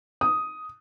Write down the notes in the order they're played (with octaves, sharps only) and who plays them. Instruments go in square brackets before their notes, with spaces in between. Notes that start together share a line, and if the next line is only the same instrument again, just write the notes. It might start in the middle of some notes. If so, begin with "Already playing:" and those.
[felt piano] D#6